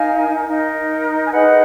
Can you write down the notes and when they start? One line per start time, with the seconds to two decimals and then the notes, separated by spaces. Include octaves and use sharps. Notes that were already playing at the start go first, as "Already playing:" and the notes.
Already playing: D#4 A#4 F5 G#5
0.47 D#4 A#4
1.26 G#5
1.31 D#4 G#4 B4 D#5 F#5